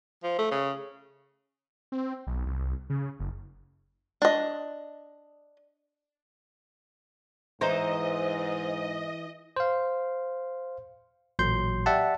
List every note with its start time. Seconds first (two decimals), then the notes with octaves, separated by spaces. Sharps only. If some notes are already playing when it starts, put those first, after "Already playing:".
0.23 F3
0.39 A3
0.51 C#3
1.92 C4
2.27 B1
2.46 C2
2.90 C#3
3.20 F#1
4.22 D4 D#5
7.61 G#2 E3 D#4 C5 D#5
9.56 C5 F5
11.39 A1 A#2 F#3 C6 G6
11.86 G4 D5 E5 F#5 A5